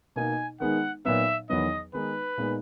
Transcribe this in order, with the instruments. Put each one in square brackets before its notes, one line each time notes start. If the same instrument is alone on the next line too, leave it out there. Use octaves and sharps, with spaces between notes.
[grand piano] B2 A#3 D#4 [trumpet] G#5
[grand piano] D#3 G#3 B3 D#4 [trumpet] F#5
[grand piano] A#2 F#3 B3 D#4 [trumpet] E5
[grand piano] E2 D#3 F#3 B3 [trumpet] D#5
[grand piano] D#3 G#3 B3 D#4 [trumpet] B4
[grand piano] A#2 G#3 B3 D#4